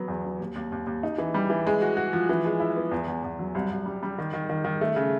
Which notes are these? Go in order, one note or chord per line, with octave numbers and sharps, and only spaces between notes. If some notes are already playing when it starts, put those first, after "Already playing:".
Already playing: F#3 B3
E2
F#3
D#2
D#2
D#2
D#2
D#4
E3
G3
E3
G#3
F#4
F#4
F3
E3
G#3
E4
B3
E2
E2
E2
F#3
C2
C2
G3
G3
D#3
D#3
D#3
D#3
A3
C#3